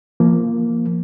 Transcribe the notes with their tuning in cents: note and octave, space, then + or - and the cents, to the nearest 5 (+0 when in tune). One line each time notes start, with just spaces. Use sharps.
F3 -15 A#3 +0